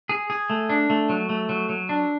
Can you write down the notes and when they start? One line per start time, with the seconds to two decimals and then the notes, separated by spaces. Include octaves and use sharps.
0.09 G#4
0.30 G#4
0.50 A3
0.70 D4
0.90 A3
1.09 F#3
1.29 A3
1.49 F#3
1.69 F#3
1.89 D4